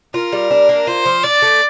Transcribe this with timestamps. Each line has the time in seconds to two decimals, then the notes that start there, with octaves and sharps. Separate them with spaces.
0.14 F4 A#4
0.32 G3
0.51 D4
0.69 A#3
0.87 F4 C5
1.06 F3
1.24 D4 D5
1.42 A3